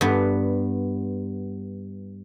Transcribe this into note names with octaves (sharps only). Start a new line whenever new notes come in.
G2 B3